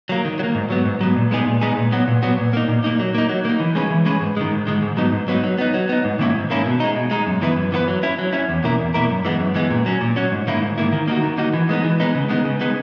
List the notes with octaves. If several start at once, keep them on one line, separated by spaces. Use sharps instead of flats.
F#3 A#3
D#3
F#3
A#3
G#2
F#3 B3
G#2
F#3 B3
A#2
G#3 B3 D#4 G#4
A#2
G#3 B3 D#4 G#4
A#2
F#3 B3 F#4
A#2
F#3 B3 F#4
A#2
A#3 D#4
A#2
A#3 D#4
F#3
A#3 D#4
F#3
A#3 D#4
E3
G#3 C#4 G#4 B4
E3
G#3 C#4 G#4 B4
G#2
D#3 G#3
G#2
D#3 G#3
G#2
F#3 B3 D#4
G#2
F#3 B3 D#4
F#3
B3 D#4
F#3
B3 D#4
G#2
D#3 A#3 C#4 E4
G#2
D#3 A#3 C#4 E4
B2
G#3 D#4
B2
G#3 D#4
F#2
E3 B3 E4 B4
F#2
E3 B3 E4 B4
F#3
C#4 E4
F#3
C#4 E4
E2
B2 A#3 E4 A#4
E2
B2 A#3 E4 A#4
F#2
E3 G#3 B3
F#2
E3 G#3 B3
A#2
F#3 C#4
A#2
F#3 C#4
G#2
D#3 A#3 E4
G#2
D#3 A#3 E4
D#3
A#3 D#4 F#4
D#3
A#3 D#4 F#4
E3
G#3 B3 D#4
E3
G#3 B3 D#4
C#3
G#3 B3 D#4
C#3
G#3 B3 D#4